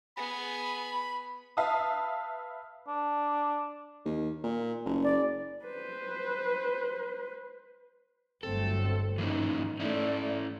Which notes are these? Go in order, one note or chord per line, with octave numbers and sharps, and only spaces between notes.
B3 G#4 B5
B4 E5 F5 A5 D#6
D4
D#2
A#2
F#1
D5
B4 C5
G1 F#3 A3 C4 A4
G#2 E3 A#3 C#4 D#4
A3 C#4 E4 D5